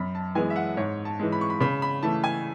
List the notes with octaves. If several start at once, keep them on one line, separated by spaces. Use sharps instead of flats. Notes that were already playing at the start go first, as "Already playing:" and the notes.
Already playing: F#2 B5
A5
E3 G#3 B3 G#5
E5
F#5
G#2 C#5
A5
E3 G#3
B5
C#6
B5
C#3 B5
B5
E3 A3 A5
G#5